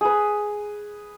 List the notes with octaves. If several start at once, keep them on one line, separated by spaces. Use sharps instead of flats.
G#4 B4